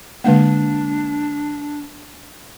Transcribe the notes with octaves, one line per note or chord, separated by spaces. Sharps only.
D3 G#3 A#3 D4